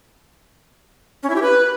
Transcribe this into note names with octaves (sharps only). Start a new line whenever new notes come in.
C#4
E4
G4
B4